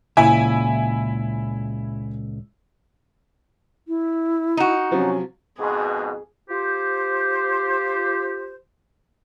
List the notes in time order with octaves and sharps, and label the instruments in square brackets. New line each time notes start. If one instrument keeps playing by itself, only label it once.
[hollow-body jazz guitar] C#2 A#2 [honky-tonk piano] E4 E5 G#5
[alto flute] E4
[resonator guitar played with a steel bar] D#4 F#4
[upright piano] C3 F3 F#3 [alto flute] C#4
[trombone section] F2 G#2 B2 [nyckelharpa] G#4
[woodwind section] F4 G4 C5